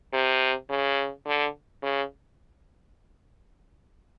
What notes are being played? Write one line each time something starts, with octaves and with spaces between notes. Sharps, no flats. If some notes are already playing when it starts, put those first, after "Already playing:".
C3
C#3
D3
C#3